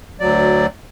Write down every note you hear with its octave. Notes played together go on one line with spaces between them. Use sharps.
D2 F#3 D5